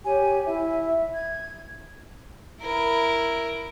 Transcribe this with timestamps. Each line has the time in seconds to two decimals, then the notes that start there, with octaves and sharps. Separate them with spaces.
0.05 G4 C#5 G#5
0.46 E4 E5
1.13 G#6
2.62 E4 A#4